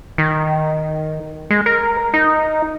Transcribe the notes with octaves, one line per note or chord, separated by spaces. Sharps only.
D#3
G#3
A#4
D#4